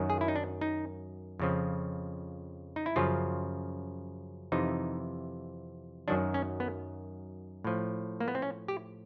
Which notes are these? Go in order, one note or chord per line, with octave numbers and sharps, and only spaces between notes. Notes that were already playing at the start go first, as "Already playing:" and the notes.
Already playing: F#2 D#3 F#3
G#4
E4
D#4
D4
D#4
F2 C#3 F3
D#4
E4
F#2 C#3 F3 F4
F2 C3 E3 D#4
F#2 D#3 F#3 D4
C#4
B3
A2 F3
A#3
B3
C4
C#4
G4